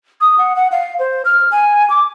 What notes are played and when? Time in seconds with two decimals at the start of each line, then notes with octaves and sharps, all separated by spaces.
0.21 D#6
0.38 F#5
0.56 F#5
0.72 F5
0.99 C5
1.25 F6
1.52 G#5
1.90 D6